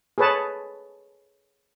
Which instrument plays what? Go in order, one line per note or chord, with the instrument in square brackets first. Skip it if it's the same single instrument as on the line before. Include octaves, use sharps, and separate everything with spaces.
[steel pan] G#4 A4 B4 C#5 A5